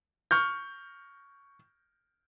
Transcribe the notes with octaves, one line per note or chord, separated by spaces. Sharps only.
C#6 F6 G6